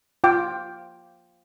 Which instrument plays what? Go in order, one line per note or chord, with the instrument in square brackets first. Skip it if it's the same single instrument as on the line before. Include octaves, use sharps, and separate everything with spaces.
[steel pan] F4 G5 D6